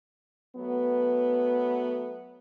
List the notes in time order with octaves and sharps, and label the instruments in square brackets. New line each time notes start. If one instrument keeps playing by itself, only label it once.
[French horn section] F#3 A3 B3